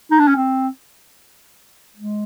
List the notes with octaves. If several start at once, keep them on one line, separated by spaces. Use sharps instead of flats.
D#4
D4
C#4
C4
G#3